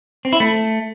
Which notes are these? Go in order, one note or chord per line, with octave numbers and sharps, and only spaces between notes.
C4
E4
A3